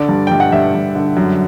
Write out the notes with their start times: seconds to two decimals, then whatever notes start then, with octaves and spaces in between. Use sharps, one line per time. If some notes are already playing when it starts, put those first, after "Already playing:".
Already playing: D3 D5
0.09 G2
0.27 G2 G5
0.40 F#5
0.52 G2 E5
0.75 G2
0.95 D3
1.17 F#2